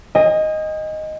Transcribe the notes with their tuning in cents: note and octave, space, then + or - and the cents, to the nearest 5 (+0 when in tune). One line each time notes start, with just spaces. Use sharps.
D#5 +0 G#5 -45